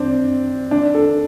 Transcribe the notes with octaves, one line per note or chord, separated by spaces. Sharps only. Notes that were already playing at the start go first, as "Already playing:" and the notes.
Already playing: C4 D4
D4
A4